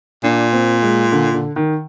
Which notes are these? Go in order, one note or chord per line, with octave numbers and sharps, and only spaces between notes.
A#2 D4
C4
G#3
D3
D3
D#3